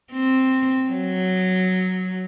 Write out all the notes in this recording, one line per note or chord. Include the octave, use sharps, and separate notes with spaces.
C4
F#3